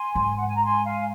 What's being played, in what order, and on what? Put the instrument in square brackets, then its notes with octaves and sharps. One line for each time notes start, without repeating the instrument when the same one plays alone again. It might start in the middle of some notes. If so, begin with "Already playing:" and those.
Already playing: [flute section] G#5 C6
[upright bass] G#2
[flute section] F#5
G#5
A#5
G#5 C6
F5 G#5